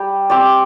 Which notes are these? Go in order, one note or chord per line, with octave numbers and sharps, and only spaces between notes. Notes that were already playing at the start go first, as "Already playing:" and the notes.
Already playing: G3 G4
C4 G4 D5